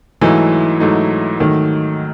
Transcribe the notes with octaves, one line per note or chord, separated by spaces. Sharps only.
G#2 E3 F#3 A3 D#4
G#2 F#3 A3 D#4
G#2 D#3 F#3 A3 D#4